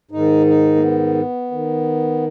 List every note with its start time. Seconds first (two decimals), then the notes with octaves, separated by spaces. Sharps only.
0.11 G#2 D#3 D#4
0.47 D#4
0.75 A#3
0.80 B3
1.51 D#3